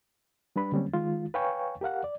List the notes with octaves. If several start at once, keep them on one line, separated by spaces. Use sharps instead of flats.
G3 D4 B4 B5
D3 F#3 G3 A#3 C4 C#4
D#3 G#3 F4
B4 C#5 F5 G5 G#5 C#6
G4 A#4 F5 F#5
D5